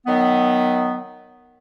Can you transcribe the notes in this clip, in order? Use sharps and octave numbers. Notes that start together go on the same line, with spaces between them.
D#3 F#3 B3